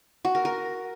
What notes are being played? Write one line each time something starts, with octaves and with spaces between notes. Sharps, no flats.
F#4
A#4
A#4